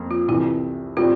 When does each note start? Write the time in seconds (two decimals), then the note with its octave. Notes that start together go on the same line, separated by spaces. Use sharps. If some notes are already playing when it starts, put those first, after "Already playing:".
Already playing: F2 A#3
0.11 F4
0.28 C2 C3 E3 E4
0.97 A2 G3 C4 F4